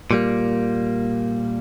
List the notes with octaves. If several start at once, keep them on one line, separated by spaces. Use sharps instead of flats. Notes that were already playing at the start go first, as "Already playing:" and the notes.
A#2 G3 A#3